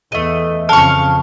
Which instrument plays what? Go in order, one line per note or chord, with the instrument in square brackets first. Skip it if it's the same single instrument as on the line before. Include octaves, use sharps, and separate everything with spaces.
[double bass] E2 [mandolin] A3 D#5
[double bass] F2 C#3 [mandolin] F5 C#6 [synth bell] A5 F6